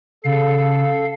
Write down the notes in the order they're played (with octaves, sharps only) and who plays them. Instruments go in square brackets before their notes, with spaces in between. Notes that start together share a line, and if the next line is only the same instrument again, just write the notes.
[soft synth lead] C#3 [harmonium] A4 [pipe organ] F5